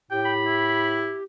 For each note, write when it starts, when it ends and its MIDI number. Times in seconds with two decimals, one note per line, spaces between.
0.11 1.13 45
0.11 1.23 67
0.11 0.33 79
0.25 0.96 83
0.46 1.20 64